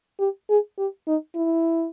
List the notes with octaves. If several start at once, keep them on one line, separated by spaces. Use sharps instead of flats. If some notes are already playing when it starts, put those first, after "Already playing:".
G4
G#4
G4
D#4
E4